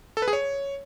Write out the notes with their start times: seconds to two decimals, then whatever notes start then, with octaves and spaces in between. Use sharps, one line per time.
0.17 A4
0.22 B4
0.28 G#4
0.33 C#5